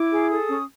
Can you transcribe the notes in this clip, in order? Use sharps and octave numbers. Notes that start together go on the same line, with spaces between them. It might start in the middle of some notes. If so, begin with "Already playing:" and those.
Already playing: E4 D6
G#4
A4 D#6
C#4